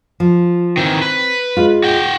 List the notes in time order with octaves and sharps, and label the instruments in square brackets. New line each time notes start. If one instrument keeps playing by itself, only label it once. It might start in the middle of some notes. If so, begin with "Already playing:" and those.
[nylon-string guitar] F3
[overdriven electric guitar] D#3 E3 [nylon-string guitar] C4
[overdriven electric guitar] B4
[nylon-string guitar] G#3 F4
[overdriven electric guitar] F#4 G5